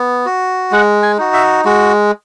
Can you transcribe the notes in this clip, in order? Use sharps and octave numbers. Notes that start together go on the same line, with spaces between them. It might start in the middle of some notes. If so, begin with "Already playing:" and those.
Already playing: B3
F#4
G#3 F#5
G#5
D#4 F#4
E5
G#3 F#4